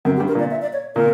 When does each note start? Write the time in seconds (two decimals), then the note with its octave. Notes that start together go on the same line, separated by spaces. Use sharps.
0.05 F#2 A#4
0.17 G4
0.20 G2
0.28 A#4
0.35 A#2 D5
0.51 E5
0.62 D5
0.73 C#5
0.95 A#2 A#4